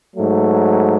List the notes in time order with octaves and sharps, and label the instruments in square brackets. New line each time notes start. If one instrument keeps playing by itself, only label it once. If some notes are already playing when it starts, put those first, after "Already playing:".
[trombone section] G#2 F#3 A3